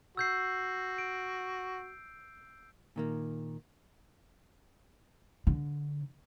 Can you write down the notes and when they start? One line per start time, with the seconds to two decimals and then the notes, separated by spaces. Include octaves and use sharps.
0.17 F#4 E6 G6 C7
0.98 D7
2.96 A#2 D#3 A#3
5.47 D3